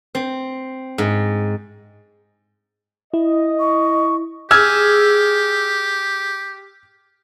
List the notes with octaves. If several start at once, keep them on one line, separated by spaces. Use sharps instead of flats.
C4
G#2
E4 D#5
C#6
G4 G#4 E6 F6 G#6